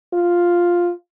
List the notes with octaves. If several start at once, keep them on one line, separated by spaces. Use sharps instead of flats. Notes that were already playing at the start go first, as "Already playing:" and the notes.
F4